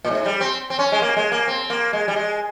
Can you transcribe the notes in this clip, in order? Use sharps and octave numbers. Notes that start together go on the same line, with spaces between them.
A#2
G#2
G3
C4
C4
C#4
G#3
A#3
G#3
A#3
C4
A#3
G#3
G3
G#3